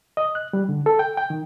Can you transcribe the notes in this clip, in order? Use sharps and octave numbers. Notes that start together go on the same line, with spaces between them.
D#5
F#6
G3
D3
A4
G5
G5
D#3